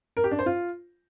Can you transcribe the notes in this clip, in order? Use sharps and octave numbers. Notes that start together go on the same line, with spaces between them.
A#4
G4
D4
C5
F4